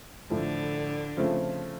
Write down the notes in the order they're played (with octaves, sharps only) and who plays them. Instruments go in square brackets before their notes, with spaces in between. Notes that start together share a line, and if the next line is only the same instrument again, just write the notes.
[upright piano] A2 F3 A3 [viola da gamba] D3
[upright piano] C#3 F3 A3 C4